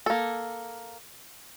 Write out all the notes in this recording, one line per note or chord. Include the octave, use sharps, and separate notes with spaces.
A#3 A4